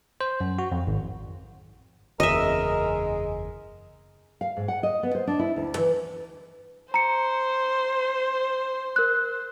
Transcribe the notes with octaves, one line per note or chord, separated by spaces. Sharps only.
C5
F#2
F#4
F2
G#1
F#1 E2 C#3 G#3 A#4 D#5 E5
F5
G#2
F#5
D#5
B3
C5
D4
E4
D2
E3
C5 A#5 C#7
A#4 F#6